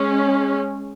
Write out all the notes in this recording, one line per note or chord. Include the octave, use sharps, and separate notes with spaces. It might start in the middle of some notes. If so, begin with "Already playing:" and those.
Already playing: G#3 C#4